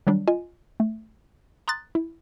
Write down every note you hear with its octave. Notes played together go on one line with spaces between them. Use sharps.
D#3 F#3 G3 D4
F4 D#5 G#5
A3
A#5 C6 D#6 F#6 A6
E4